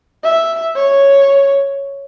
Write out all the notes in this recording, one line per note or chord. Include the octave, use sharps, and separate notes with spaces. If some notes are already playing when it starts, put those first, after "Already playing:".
E5
C#5